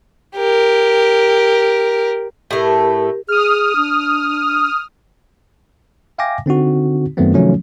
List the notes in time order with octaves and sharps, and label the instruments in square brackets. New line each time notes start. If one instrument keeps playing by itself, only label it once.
[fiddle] G4 A#4
[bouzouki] A2 A3 [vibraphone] G4 A#4
[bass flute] G#4 [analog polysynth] D#6 F6
[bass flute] D4
[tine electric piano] E5 F5 G5 G#5 D6 A#6
D3 C4 D#4 F#4
F#2 D#3 F#3 A3 B3 C4
C3 D#3 F3 F#3 A3 C#4